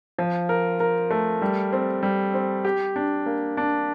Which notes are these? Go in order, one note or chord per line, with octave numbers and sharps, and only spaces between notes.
F3
A#4
A#4
A3
G3
C4
G3
C4
G4
D4
A#3
D4